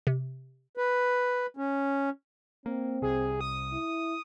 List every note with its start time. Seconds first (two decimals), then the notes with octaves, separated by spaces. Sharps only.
0.07 C3
0.77 B4
1.57 C#4
2.66 A#3 C4
3.02 C2 C3 G#4
3.41 D#6
3.73 E4